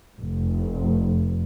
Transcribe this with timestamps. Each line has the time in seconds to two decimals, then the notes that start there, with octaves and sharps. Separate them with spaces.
0.20 F1